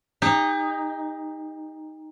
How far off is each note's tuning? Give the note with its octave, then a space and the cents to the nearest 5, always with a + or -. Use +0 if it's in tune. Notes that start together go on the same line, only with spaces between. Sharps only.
D#4 +0 G4 +40